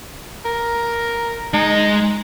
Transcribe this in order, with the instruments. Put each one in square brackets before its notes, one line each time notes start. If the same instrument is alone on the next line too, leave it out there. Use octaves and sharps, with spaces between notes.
[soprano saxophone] A#4
[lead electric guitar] G#3 [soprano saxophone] D#4